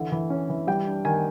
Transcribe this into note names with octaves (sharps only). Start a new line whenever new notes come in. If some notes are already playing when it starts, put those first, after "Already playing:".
Already playing: D3 E3
E3
C#4
E3
G3 G5
D4
D#3 G#5